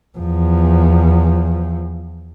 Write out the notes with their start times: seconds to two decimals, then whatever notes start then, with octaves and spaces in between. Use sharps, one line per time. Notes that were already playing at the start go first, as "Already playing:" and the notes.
0.17 E2 F3